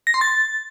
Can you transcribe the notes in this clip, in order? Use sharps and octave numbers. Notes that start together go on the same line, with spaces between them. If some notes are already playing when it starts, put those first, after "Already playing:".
A#6
C6
A6